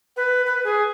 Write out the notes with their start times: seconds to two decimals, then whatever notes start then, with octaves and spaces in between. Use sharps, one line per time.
0.16 B4
0.46 B4
0.64 G#4